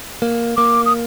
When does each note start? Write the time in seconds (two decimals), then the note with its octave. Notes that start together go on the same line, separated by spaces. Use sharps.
0.22 A#3
0.57 A#3 D6
0.86 D#6